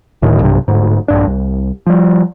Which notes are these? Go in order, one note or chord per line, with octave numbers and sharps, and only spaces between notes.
D1 D2 A2 D#3
B1 G2 C3
D1 D2 G#2
A#1 G2 D4
C2
F3 G3